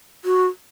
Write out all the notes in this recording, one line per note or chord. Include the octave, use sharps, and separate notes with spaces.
F#4